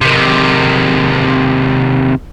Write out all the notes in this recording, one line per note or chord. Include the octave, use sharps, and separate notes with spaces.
C3 D#3